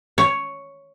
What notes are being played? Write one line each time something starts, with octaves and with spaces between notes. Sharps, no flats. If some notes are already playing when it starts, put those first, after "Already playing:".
C#5